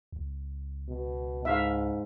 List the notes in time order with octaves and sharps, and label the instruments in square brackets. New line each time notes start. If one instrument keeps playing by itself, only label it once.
[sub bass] C#2
[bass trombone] B2
[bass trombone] G#2 [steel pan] E5 F5